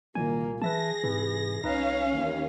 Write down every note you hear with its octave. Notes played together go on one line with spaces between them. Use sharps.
C2 A#2 D#3 A#3 G#5
E3 G#4 B4 E5 A5 A#6
G#2 C3 E3
C2 C#4 D#4 B4 F5 A#6
D#2 E3